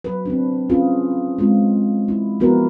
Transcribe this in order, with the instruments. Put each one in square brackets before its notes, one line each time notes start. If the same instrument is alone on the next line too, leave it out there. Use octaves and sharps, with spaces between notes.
[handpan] F#3 B4
C4 D4
C4 C#4 F4 G#4 B4
G#3 C4 F4
E4
F3 B3 E4 F#4 A#4 B4